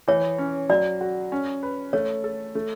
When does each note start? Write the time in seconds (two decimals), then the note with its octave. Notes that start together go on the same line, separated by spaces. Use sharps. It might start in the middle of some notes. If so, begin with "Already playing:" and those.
0.08 E3 C#5
0.38 C#4
0.69 F#3 D5
1.01 F#4
1.32 C#4
1.63 B4
1.93 A3 C#5
2.24 A4
2.55 A3